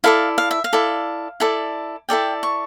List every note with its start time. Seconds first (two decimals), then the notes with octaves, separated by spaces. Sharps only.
0.04 E4 A4 D5 F5
0.38 F5
0.51 E5
0.64 F5
0.73 E4 A4 D5
1.40 E4 A4 D5
2.09 E4 A4 D5 G5
2.43 C#6